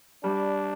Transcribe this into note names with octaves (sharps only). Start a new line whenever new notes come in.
G3 D4